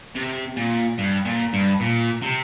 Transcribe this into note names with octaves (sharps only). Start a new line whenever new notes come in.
C3
A#2
G2
A#2
G2
A#2
C3